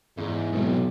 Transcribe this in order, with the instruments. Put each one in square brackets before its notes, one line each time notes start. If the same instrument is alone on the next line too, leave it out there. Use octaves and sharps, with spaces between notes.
[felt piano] E2 E3 [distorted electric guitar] G#2
[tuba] B1 [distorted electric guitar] G#2 C3